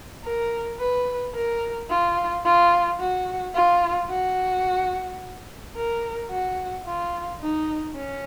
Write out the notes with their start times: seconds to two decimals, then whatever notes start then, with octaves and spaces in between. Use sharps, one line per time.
0.24 A#4
0.80 B4
1.34 A#4
1.90 F4
2.45 F4
3.00 F#4
3.55 F4
4.10 F#4
5.76 A#4
6.31 F#4
6.86 F4
7.41 D#4
7.96 C#4